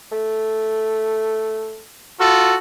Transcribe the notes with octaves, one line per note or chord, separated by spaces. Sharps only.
A3
F4 F#4 A4